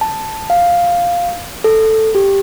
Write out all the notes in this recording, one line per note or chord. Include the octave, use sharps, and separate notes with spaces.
A5
F5
A4
G4